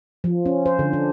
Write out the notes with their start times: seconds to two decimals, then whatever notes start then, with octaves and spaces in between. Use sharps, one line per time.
0.24 F3
0.46 C#4
0.66 C5
0.79 D3
0.93 D4